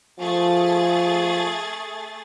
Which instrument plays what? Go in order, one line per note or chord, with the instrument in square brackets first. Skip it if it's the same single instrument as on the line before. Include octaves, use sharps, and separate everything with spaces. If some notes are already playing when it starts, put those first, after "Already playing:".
[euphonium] F3 [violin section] A3 G#4 A6